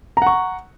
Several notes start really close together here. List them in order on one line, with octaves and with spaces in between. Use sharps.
A#5 F#5 C#6